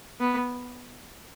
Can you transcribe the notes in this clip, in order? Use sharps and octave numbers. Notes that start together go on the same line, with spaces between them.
B3